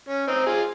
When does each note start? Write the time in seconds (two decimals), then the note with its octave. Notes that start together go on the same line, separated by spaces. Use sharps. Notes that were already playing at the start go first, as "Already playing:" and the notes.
0.09 C#4
0.28 C4 D#4
0.46 F4 G#4